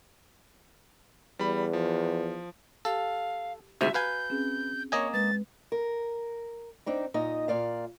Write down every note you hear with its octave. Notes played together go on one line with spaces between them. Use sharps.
E2 G3 B5
F3
G4 A4 F5
D2 G#2 C3 F#4 E5
B4 F5 G#5 A#5 G6
C4 C#4 G#4
A#3 C#5 D#5 G#5
G#3 B4 A6
A#4
C4 D4 D#4
A#2 D#4 D#5
A#2 D5 F5